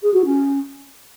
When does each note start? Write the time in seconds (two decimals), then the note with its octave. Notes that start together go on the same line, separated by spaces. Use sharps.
0.02 G#4
0.13 F#4
0.24 C#4